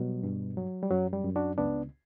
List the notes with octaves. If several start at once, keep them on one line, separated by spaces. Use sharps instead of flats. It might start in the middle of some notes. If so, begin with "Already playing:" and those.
Already playing: B2 F#3 G3
G2
F#3
G3
F#2 F#3
G3
F#2
D4 F#4
C#2 B3 D4